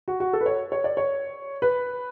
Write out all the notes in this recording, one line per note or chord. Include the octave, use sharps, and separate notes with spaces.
F#4
F#4
A4
B4
C#5
C#5
D5
C#5
B4